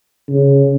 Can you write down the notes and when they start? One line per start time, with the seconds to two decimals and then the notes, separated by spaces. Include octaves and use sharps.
0.29 C#3